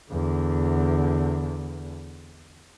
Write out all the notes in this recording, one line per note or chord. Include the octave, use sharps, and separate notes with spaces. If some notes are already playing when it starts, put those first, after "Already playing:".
E2 D3